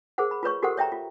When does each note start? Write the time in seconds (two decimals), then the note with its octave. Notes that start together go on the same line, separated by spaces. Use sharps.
0.18 G#4 A#4 C5 F#5
0.31 B5
0.43 F4 B4 C#5 C#6
0.63 F#4 G4 A4 A#4 C5 F#5
0.77 C#5 E5 G5 A#5
0.92 F4